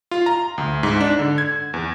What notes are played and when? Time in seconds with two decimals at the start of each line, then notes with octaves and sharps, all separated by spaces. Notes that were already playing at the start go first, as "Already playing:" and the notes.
0.11 F4
0.26 A#5
0.58 D2
0.83 G#2
1.00 D4
1.19 D3
1.38 G#6
1.74 E2